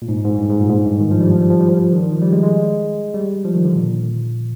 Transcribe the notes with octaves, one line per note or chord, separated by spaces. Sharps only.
A#2
G#2
G#2
G2
G#2
A#2
G#2
G2
D#3
F3
G3
F3
G3
F3
G3
F3
D#3
D#3
F3
G3
G#3
G#3
G3
F3
D#3
D3
A#2